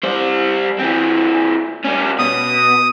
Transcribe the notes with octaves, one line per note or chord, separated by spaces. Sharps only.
G3 C5
E3 C4
G3 C#4
B2 D#6